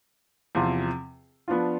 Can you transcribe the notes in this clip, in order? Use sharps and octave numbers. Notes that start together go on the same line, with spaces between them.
E2 C3 F3 C4 F4
F3 B3 D4 F4